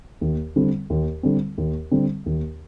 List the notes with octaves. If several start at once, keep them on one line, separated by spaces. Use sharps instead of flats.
D#2
D3 G3 C4
D#2
D3 G3 C4
D#2
D3 G3 C4
D#2